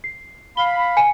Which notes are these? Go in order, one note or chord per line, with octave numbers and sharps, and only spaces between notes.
C7
F5 B5 G7
G#5 C#7